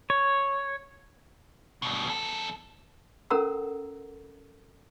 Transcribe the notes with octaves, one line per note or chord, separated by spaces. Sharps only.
C#5
G2 B2
E2 A4
C#4 A4 A#4 F#5 A#5 E6